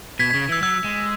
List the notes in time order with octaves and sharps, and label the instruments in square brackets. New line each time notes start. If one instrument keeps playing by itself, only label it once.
[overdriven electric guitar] B2 [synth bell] G#6 B6
[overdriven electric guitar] C#3 [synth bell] G#6 B6
[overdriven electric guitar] E3 [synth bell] E6 G#6
[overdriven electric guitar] F#3 [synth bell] E6 G#6
[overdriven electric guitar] G#3